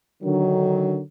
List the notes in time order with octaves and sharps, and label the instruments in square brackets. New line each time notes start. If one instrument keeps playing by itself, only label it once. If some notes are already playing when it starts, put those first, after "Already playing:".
[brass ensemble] D3 D#3 F#3